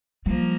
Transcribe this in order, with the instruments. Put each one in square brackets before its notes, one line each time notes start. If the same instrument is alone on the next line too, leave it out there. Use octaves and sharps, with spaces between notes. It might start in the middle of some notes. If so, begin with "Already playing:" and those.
[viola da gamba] F3 A#3 [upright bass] G3